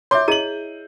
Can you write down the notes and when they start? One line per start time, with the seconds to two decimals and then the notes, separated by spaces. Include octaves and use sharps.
0.11 C#5 E5 C6 D6 G6
0.28 E4 G#4 D#5 D#7 F#7